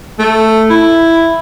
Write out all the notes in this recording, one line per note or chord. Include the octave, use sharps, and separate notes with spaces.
A3
E4